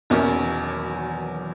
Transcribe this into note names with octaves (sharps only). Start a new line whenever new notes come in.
E1 E2 B2 D#3 A#3 C#4
D#3
E3
F#3